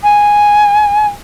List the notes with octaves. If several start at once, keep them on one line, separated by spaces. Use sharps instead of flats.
G#5